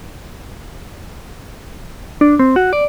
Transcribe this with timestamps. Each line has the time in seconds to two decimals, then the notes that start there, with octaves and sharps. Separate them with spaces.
2.21 D4
2.39 C4
2.56 F#4
2.73 D5